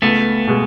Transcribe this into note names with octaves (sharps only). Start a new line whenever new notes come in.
C#2 A3 B3
B2 G#3